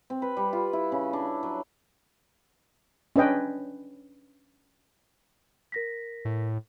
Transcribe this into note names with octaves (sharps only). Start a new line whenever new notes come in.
C4
B4
G3
F4
E4
C#3
D4
F#3
C#4 D4 B4 D#5 G5
A#4 A#6 B6
A2